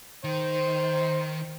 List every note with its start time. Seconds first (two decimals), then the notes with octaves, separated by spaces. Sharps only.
0.24 D#3 C5